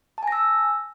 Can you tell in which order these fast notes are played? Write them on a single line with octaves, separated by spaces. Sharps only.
A5 G#5 A#6 E6